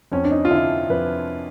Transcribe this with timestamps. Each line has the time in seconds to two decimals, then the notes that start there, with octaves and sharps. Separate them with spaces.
0.12 F2 C#4
0.24 D4
0.31 D#4
0.45 F4
0.51 D3 E4
0.90 F2 B4